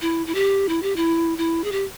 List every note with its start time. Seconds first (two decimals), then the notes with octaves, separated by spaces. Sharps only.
0.01 E4
0.27 E4
0.35 G4
0.69 E4
0.82 G4
0.96 E4
1.38 E4
1.64 G#4
1.72 G4